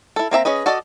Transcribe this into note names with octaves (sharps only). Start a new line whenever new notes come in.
E4 A4
A#3 C4 E5 A#5
C#4 G#4 B4 D#5
F#4 A4 D5 D#5